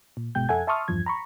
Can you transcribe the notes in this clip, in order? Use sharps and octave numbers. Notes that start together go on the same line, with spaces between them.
A#2
G1 B2 G#3 G5 G6
F2 A4 E5 F#5 G#5 G#6
E5 A5 C6 C#6 D#6 F6
E2 G2 F3 G#6
A#5 B5 C#6